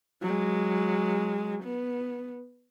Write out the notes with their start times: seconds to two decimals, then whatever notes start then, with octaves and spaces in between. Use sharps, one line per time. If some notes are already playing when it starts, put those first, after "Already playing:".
0.22 F#3 G#3
1.64 B3